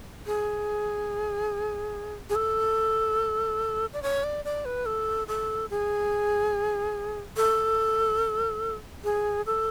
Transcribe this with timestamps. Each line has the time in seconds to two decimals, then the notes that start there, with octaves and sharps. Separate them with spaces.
0.27 G#4
2.30 G#4
2.35 A4
3.93 D5
4.03 C#5
4.24 D5
4.45 D5
4.65 B4
4.86 A4
5.28 A4
5.70 G#4
7.37 A4
9.04 G#4
9.46 A4